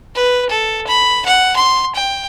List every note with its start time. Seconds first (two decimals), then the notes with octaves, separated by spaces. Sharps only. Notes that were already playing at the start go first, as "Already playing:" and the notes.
0.15 B4
0.50 A4
0.87 B5
1.26 F#5
1.56 C6
1.95 G5